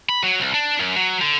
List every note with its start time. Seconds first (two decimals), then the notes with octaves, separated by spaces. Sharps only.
0.09 B5
0.23 F#3
0.40 C2
0.54 D4
0.80 F#2
0.96 F#3
1.22 D3